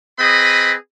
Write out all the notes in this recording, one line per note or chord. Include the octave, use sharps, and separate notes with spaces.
C4 G#4 B4 D#5 B5